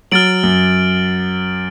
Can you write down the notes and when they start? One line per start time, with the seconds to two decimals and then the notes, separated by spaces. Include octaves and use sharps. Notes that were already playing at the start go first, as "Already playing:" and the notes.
0.12 F#3 F6 A6 D7 F#7
0.43 F#2